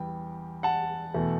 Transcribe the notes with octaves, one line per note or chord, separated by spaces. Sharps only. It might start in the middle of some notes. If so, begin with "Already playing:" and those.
Already playing: E2 G3 B3 G5
F#5 A5
E2 B2 A3